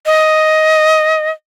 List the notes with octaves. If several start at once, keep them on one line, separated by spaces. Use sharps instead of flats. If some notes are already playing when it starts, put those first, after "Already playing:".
D#5